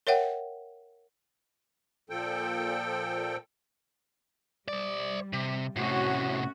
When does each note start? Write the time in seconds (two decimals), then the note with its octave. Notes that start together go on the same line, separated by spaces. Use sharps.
0.07 A#4 C#5 E5 F#5 G5
2.10 A#2 F3 A4 G5
4.68 G3 C5 D5
5.33 C3
5.76 A2 C3 A3 C#4 F#4